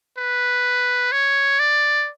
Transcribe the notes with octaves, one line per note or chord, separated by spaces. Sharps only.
B4
C#5
D5